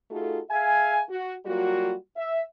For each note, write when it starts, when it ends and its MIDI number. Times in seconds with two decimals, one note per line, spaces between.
0.10 0.39 57
0.10 0.39 63
0.10 0.39 65
0.10 0.39 66
0.10 0.39 68
0.10 0.39 69
0.50 1.01 68
0.50 1.01 76
0.50 1.01 77
0.50 1.01 80
1.09 1.34 66
1.45 1.93 54
1.45 1.93 55
1.45 1.93 58
1.45 1.93 65
1.45 1.93 66
2.16 2.42 76